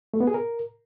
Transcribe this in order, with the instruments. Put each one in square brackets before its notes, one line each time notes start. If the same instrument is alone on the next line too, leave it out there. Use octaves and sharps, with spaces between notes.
[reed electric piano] A3
B3
G#4
A#4